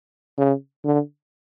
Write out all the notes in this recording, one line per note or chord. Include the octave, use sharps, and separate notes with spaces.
C#3
D3